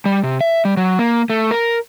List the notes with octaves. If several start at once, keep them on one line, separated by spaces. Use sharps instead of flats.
G3
C3
E5
G3
F#3
A#3
A3
A#4